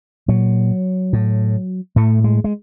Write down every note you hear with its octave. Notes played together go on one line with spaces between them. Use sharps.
A#2 F#3
A2
A2 A3
G#3
G#3